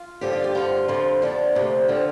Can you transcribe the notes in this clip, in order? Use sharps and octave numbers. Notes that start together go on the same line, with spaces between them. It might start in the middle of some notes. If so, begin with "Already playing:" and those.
Already playing: F4
G2 D3 F3 G4
F4
G4
G2 D3 F3 F4
F2 D3 F3
F2 D3 F3 D4
D2 C3 F3
D3 F3 C4